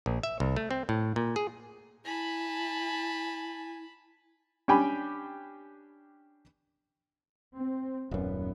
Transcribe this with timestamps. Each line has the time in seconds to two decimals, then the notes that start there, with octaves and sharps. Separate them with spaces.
0.06 A#1
0.23 E5
0.40 C2
0.57 A3
0.71 C4
0.89 A2
1.16 A#2
1.36 G#4
2.05 E4 G#5 A5 B5
4.68 C#4 D4 G4 G5 G#5 B5
7.57 C4
8.11 D#1 F#2 B3